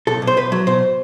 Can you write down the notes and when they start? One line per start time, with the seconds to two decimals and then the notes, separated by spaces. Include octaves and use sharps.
0.07 B1 A4
0.22 B1
0.27 C5
0.37 B1 B4
0.52 F#3
0.67 B2 C5